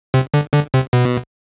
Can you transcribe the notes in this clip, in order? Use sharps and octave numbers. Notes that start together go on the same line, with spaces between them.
C3
D3
D3
C3
B2